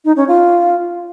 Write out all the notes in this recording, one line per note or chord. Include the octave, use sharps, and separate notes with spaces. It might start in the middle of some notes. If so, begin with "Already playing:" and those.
D#4
C#4
F4